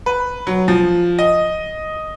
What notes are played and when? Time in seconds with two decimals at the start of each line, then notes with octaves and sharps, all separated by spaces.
0.06 B4
0.47 F#3
0.68 F3
1.19 D#5